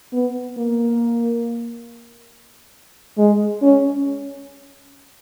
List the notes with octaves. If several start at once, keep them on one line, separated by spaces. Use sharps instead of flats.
B3
A#3
G#3
C#4